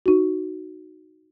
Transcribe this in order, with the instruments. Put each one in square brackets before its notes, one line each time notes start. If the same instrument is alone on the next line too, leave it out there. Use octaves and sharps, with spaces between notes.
[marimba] D#4 F#4